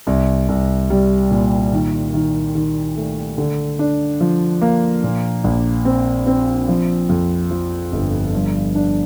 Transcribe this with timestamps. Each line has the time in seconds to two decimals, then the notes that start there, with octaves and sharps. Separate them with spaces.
0.07 C2
0.49 C2
0.90 G3
1.31 A#2
1.73 D#3
2.14 D#3
2.55 D#3
2.96 A3
3.38 D3
3.79 D4
4.21 F3
4.62 A#3
5.04 A#2
5.44 A#1
5.85 C4
6.27 C4
6.68 F3
7.09 F2
7.51 F3
7.92 G1
8.33 G2
8.75 D4